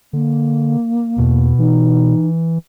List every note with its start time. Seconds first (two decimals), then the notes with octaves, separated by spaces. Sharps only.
0.13 D3 A#3
1.18 E2 B2
1.59 E3 D#4